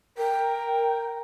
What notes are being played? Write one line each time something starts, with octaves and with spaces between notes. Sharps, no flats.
A#4 G5